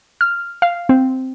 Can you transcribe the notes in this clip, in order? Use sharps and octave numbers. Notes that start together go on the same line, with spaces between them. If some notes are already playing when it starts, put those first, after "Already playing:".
F6
F5
C4